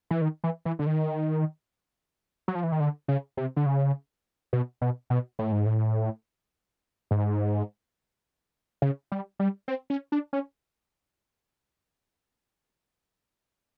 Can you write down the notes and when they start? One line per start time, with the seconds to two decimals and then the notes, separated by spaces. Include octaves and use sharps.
0.11 E3
0.21 D#3
0.44 E3
0.65 E3
0.79 D3
0.86 D#3
2.48 F#3
2.55 F3
2.63 E3
2.72 D#3
2.80 D3
3.08 C#3
3.37 C3
3.56 D3
3.66 C#3
4.53 B2
4.81 B2
5.10 B2
5.39 A2
5.52 G#2
5.66 A2
7.11 G#2
8.82 C#3
9.12 G3
9.39 G3
9.68 C4
9.90 C#4
10.12 D4
10.33 C#4